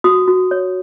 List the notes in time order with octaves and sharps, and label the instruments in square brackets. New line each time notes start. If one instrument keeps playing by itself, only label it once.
[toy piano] F#4 D#6
F#4
C#5